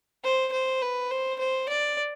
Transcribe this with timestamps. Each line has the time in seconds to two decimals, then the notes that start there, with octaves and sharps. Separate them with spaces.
0.23 C5
0.52 C5
0.81 B4
1.11 C5
1.39 C5
1.69 D5